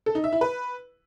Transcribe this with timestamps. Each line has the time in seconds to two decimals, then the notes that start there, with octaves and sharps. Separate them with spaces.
0.06 A4
0.15 D#4
0.24 E5
0.33 E4
0.41 B4